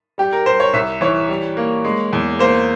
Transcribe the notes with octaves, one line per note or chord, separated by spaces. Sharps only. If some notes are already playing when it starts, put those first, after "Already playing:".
G3 G4
A#4
G3 C5
C#5
C2 E5
E3 C#5
G3
A#3
G#3
E2
A#3 C5